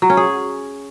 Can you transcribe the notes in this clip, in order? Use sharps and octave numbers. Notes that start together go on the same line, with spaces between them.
F#3
C#4
G#4